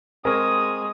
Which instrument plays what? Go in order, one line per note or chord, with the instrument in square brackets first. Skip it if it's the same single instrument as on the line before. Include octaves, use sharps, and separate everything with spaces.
[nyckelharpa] G#3 [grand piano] C4 G#4 A#4 [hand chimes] G#5 A#5 C#6 [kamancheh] D#6